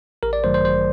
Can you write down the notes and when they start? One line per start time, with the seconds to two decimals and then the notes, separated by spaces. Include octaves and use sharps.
0.23 A1 A#4
0.33 D5
0.44 G2 D#3 F#3 A3 C5
0.54 C5
0.65 A1 C5